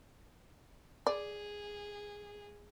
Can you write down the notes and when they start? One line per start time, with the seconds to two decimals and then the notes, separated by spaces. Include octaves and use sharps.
1.07 G#4 D5